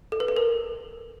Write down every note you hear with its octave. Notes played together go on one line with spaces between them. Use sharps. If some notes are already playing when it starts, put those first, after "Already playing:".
A4
B4
A4
A#4